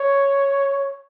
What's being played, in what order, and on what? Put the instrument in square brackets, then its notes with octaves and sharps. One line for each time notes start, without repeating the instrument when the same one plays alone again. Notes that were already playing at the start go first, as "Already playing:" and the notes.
Already playing: [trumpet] C#5